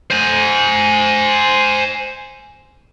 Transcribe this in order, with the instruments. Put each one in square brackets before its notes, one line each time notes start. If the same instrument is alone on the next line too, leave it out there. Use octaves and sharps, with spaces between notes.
[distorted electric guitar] C5 G#5